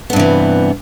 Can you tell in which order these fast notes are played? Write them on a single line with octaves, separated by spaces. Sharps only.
B3 G2 C3 E3